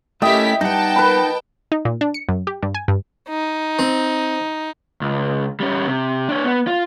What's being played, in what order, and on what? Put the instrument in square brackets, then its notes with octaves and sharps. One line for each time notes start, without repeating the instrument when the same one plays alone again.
[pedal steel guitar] A3 C#4 [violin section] E4 G4 B6 [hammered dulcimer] D#5 [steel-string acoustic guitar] E5 G5
[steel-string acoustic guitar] G3 B3 [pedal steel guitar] D#4 F#5 [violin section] G5 A5
[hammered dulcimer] B4 B5
[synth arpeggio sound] D#4
A#2
D4
C#7
F#2
G4
G2
G#5
G2
[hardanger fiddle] D#4
[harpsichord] C4
[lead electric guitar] C#2
G3 C#4
C3
D4 C#5
B3
F4